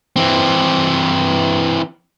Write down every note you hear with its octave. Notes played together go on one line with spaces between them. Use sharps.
E3 C4